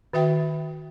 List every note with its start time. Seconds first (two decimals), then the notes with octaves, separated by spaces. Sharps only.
0.13 D#3 F#4 E5 G5